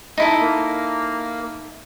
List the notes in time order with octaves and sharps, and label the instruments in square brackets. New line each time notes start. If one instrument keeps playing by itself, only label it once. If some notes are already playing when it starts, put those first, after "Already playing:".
[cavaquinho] D#4 E4 A4
[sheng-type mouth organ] A#3